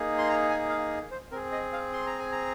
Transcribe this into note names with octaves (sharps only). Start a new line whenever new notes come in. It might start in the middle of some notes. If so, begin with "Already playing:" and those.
Already playing: A#3 D#4 G#4
C6
A#5
G#5
F5
C5
C4 G#4 A#4
D#5
F5
C6
A#5
G#5
A#5